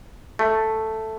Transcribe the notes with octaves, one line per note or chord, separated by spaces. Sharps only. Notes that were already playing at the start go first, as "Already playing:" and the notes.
A3